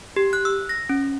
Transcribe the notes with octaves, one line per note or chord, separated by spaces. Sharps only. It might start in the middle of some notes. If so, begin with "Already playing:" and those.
G4
F#6
E6
A#6
C#4